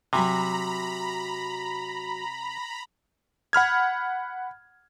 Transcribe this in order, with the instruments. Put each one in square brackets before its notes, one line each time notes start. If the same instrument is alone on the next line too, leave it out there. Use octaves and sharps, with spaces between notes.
[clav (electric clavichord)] C3 [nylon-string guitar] F#3 F#4 G#5 [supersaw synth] A#5 B5
[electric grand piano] F#5 B5 F6 G#6